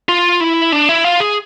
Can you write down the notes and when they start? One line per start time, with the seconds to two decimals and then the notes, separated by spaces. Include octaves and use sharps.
0.09 F4
0.40 E4
0.72 D4
0.89 E4
1.04 F4
1.20 G#4